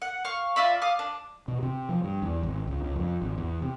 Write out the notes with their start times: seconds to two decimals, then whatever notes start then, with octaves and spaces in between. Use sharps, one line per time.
0.02 F#5
0.25 F5 C#6
0.56 F4 D5 E5 B5
0.82 F5 D6 D#6
0.99 D4
1.48 B2
1.63 C3
1.89 F3
2.04 G2
2.22 E2
2.43 G#1
2.67 C#2
2.83 C#2
2.96 F2
3.22 G#1
3.38 E2
3.62 C3